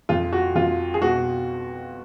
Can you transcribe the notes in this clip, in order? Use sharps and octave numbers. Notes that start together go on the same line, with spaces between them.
F2 F4
F#4
F2 F4
G#4
B2 F#4